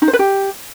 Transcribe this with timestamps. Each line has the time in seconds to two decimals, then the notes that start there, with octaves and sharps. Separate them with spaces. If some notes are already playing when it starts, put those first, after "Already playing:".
0.02 D#4
0.08 C5
0.13 B4
0.19 G4